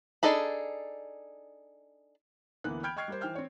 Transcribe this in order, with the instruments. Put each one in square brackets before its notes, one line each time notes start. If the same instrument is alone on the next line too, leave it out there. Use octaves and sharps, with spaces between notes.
[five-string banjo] D4 D#4 G#4 A4 B5
[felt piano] D2 E3 A#3 B3 F#6
G5 B5 F6 G6 G#6 D7
D#5 G5 C#6 F6 G#6 C7
G3 A#4 C5
E3 C5 G5 F6 G6
C4 C#5